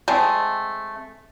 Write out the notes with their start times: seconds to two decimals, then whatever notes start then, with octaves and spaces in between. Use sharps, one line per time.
0.08 G#3 A3 C4